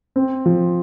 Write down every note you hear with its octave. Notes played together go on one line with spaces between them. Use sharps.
C4
F3